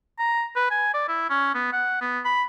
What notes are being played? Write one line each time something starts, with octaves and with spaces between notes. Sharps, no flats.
A#5
B4
G#5
D5
E4
C#4
B3
F#5
B3
B5